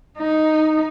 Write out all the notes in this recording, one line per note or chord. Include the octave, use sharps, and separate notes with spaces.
D#4